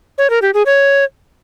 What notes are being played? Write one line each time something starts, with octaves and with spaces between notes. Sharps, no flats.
C#5
A#4
G4
G#4
C#5